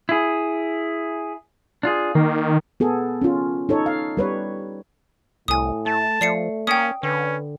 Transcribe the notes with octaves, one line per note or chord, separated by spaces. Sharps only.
E4 G#4
D4 F4 G#4
D#3 A#3
B3 G#4 A4
C#4 F4
D#4 A4 C#5
F5
G3 B4 C#5
C2 A2 G#5 D#6
A3 A5
F3 A3 D5 C7 C#7
A#3 C#4 G5 D#6
D3 C#4 B4